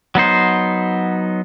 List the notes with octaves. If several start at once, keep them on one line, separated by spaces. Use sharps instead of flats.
F#3 B3 D#4 C5